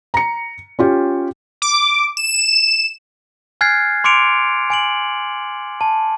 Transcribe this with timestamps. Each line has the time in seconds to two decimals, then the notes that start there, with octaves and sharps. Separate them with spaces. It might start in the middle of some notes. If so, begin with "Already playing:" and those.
0.14 A#5 C#7
0.79 C#4 F4 G4
1.62 D6
2.17 E7
3.61 G#5 F6 F#6 G#6 A6 C7
4.04 C6 D6 C#7 D7 F7
4.70 G#5 D7 F#7
5.81 A5